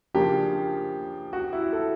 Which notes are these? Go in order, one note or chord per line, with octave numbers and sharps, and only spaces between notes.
C#3 F3 A#3 D4 G4
F#4
E4
A4